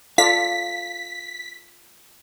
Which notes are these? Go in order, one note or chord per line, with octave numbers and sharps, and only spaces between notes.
F4 A4 D5 F5 B6